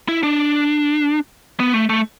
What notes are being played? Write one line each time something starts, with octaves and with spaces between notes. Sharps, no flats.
E4
D4
B3
A3
A3